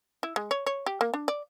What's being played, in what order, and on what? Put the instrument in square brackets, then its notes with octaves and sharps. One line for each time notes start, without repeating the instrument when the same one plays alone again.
[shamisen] E4
G#3
C#5
C#5
G4
A#3
D4
D5